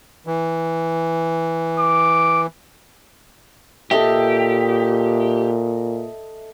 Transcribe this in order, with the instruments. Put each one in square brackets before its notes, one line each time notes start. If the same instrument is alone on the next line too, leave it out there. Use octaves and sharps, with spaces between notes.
[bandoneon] E3
[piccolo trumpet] D6
[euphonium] A#2 [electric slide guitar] G4 [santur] A4 D#5 E5